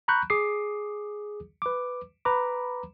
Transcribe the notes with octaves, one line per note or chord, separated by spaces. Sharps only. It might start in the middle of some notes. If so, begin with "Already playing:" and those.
A#5 B5 C#6 F#6 G6
G#4 D6 D#6 C7
B4 D6
B4 A#5 B5 D6